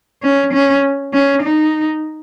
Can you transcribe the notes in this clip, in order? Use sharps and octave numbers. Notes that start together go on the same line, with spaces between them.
C#4
C#4
C#4
D#4